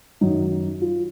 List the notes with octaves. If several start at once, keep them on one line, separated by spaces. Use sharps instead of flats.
F#2 D#3 D#4
F4